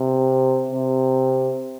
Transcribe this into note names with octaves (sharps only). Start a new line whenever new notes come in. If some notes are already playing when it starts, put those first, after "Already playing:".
Already playing: C3
C3